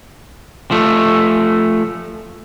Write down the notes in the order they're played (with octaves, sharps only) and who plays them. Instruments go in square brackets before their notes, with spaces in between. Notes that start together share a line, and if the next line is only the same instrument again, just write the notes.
[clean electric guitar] F3 A3